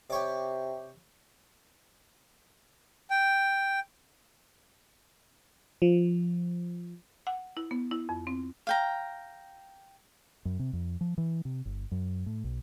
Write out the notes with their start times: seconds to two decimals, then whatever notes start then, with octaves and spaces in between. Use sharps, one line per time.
0.10 C3 G4 C#5 D5
3.10 G5
5.82 F3
7.27 F#5
7.57 E4
7.71 B3
7.91 E4
8.09 F2
8.27 C4
8.67 F5 G5 A#5
10.45 F#2
10.59 C3
10.73 F2
11.01 F3
11.18 E3
11.45 C3
11.65 G1
11.91 F#2
12.26 A2
12.44 B1